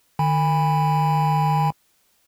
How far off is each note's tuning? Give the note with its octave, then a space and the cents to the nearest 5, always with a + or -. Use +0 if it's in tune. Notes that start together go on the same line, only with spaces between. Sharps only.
D#3 -35 G#5 -35 B5 +0